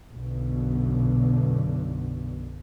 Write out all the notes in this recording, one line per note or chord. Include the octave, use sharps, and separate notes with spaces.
B1 F#2 B2 D3